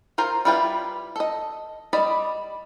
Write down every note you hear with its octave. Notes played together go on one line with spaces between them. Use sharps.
F4 A#4 C5
G3 E4 F4 B4 G5
A4 D#5
G3 D5 D#5 B5